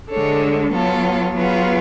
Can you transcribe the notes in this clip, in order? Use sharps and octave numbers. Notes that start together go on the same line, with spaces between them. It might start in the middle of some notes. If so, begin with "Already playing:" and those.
D3 G#3 D4 A4 C#5
F#3 B3 F4 A4 C#5
F#3 B3 F4 G#4 B4